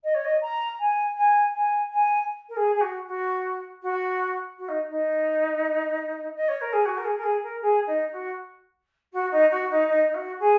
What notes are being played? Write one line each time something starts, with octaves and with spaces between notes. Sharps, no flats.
D#5
C#5
D#5
A#5
G#5
G#5
G#5
G#5
A#4
G#4
G#4
F#4
F#4
F#4
F#4
D#4
D#4
D#5
C#5
A#4
G#4
F#4
A#4
G#4
A#4
G#4
A#4
G#4
D#4
F#4
F#4
D#4
F#4
D#4
D#4
D#4
F#4
G#4